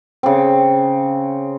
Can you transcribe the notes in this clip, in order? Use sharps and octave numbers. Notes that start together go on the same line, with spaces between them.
C#3 C4